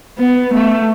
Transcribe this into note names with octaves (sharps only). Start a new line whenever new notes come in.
B3
A3